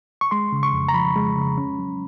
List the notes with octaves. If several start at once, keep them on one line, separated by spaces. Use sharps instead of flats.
C#6
G#3 C6
C#3
C#6
F2
A#5
F3 B5
G#3
C#3
C#4
F#3